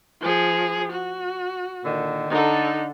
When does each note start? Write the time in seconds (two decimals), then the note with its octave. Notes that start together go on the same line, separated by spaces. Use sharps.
0.21 F3 G#4
0.92 F#4
1.84 A#2 D3 D#3
2.30 D3 D#4 A4